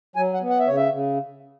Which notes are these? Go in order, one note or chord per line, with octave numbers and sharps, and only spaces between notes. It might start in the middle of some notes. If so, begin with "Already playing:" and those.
F#3 G#5
F#5
B3
F#5
E5
C#3 C#5
E5
C#3